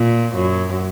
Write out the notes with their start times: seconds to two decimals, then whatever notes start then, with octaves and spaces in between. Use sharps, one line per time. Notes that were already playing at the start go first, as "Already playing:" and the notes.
Already playing: A#2
0.35 F#2